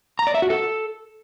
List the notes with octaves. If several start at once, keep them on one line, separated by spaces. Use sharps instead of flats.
A#5
D5
E5
F#4
A4